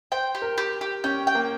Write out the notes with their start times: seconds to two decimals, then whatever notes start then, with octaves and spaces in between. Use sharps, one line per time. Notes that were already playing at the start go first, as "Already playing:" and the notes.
0.12 C5 G5
0.35 G4
0.42 A#4
0.58 G4
0.81 G4
1.04 C#4 G5
1.27 G5
1.35 A#3